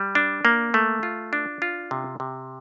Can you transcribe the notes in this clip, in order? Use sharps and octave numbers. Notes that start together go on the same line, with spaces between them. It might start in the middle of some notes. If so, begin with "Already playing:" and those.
Already playing: G3
D4
A#3
A3
F4
D4
F4
C3
C3